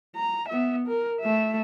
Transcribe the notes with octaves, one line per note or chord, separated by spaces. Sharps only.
A#5
B3 E5
A#4
A3 E5